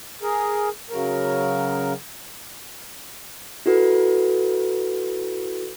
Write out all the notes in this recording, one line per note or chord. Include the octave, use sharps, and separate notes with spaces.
G#4 A#4
C#3 F#3 A#4
E4 F#4 A4 B4